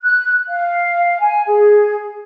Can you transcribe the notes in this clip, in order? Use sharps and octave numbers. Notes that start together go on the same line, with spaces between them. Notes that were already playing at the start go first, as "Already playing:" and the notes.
F#6
F5
G#5
G#4